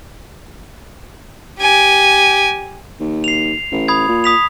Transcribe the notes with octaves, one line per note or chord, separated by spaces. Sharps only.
G4 G#5
D#2
C7 F7
A1
B5 D#6 G#6
A#2
D#6 B6 F7